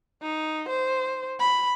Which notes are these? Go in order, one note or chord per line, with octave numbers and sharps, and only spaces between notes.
D#4
C5
B5